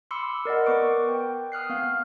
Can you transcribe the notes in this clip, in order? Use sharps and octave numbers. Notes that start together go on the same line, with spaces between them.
B5 C6 D6 E6 C#7
A#4 D5 D#5 F#5
B3 A#4 B4 C#6 D6 D7
G5
D#6 F6 F#6 C7
B3 F5